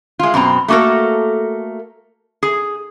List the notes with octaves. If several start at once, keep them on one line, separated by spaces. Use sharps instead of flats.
G#3 F4
F#2 B2 C4 A#5
A3 A#3 F#4 A4 A#4
G#4